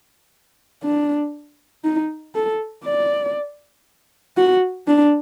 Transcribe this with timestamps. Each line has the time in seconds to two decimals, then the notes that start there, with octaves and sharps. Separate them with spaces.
0.83 D4
1.84 D#4
2.35 A4
2.85 D5
4.37 F#4
4.87 D4